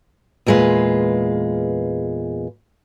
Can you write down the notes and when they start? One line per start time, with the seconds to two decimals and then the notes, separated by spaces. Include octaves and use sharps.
0.46 E2 A#2 G#3 F4 B4